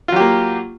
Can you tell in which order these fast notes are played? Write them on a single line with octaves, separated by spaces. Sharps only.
F4 F#3 G4 A#3